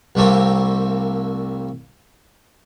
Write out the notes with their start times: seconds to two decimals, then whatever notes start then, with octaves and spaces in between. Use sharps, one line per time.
0.15 C2 G3 A3 A#3 C4